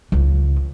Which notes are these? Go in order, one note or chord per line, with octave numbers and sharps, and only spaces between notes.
C#2